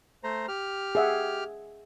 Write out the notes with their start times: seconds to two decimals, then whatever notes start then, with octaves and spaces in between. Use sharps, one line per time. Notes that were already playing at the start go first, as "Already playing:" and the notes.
0.24 A3 C5 A#5
0.48 G4 F6
0.95 G#4 E5 F#5